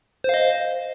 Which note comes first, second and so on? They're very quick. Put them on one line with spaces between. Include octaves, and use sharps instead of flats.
C5 F5 D#5